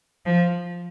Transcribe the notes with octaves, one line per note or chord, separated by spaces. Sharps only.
F3